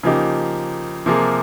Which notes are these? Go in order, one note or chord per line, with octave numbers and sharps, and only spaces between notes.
C#3 F3 A#3 D#4 G4
C3 F3 A#3 F4 G#4